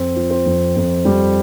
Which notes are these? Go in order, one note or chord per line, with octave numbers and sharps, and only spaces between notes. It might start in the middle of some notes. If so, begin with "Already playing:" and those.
Already playing: F2 C4
F3
C4
F2
F2
F2 G3